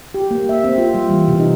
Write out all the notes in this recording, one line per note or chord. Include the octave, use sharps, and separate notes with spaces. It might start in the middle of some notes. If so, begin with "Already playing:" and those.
G4
A#3
E5
C4
F4
G3
E3
C3
D#4